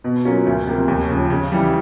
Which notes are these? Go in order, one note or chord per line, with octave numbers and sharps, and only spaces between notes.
B2
F#3 A#3 C#4 F4
D2
C3 F3 A#3
D#2
C#3 F3
C#3
E3 G3